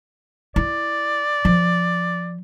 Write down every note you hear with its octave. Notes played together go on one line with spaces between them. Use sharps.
E4 D5
F3